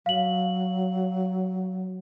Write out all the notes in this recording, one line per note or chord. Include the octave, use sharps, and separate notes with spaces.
F#3 F5 F#7